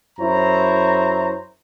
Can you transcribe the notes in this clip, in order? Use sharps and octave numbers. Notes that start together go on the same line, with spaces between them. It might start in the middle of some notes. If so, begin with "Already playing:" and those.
F#2 E4 C5 C#5 A#5